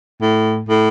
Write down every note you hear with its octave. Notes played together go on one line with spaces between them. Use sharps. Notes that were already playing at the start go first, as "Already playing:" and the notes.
A2
A2